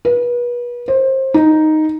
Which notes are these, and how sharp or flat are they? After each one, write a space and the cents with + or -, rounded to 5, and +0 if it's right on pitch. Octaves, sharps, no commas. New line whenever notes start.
B4 -35
C5 +25
D#4 +0